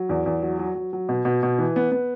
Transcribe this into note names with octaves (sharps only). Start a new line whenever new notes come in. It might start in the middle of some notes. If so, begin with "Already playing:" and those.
Already playing: F#3
E2
E2
F#3
F#3
F#3
F#3
B2
B2
B2
E3
B3
B3